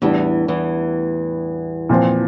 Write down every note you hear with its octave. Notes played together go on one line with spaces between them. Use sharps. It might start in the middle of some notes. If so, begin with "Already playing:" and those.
E2 A2 E3 G3 D4
E2 E3
A#2 F3 C4